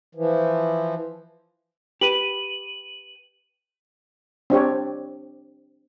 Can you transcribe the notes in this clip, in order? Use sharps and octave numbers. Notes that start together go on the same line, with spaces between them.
E3 F3
G4 B4 D#7 F#7
C4 D4 G4 C#5